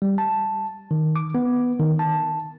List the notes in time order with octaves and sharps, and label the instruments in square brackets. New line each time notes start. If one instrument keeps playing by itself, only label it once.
[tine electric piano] G3
A5
D#3
D6
B3
D#3
A5